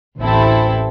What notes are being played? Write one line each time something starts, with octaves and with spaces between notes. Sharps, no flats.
A1 D2 E3 C4 E4 A4